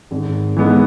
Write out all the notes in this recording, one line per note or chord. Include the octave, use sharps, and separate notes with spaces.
G#1
G#2 E3 G#3 B3